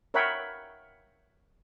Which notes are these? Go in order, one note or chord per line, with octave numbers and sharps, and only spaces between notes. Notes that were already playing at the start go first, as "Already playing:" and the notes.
A#4 C#5 E5 F#5 G5 B5